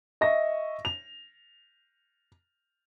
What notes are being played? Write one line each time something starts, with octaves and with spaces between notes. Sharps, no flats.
D#5 E5 C#6 A#6
F7